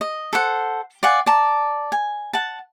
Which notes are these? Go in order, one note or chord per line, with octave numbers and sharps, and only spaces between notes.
D#5
A4 C5 F#5
D5 F5 F#5 G#5
D5 A5 A#5
G#5
F#5 A5